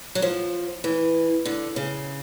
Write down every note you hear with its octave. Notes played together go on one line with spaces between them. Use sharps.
F#3
F3
E3
D3
C#3